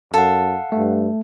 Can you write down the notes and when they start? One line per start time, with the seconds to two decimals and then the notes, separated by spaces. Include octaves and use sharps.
0.14 F#2 A4 F5 F#5
0.72 G2 A3